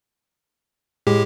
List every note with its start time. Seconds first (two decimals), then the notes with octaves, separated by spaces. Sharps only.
1.07 A2 G#3 G4